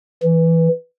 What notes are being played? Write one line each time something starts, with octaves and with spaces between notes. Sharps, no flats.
E3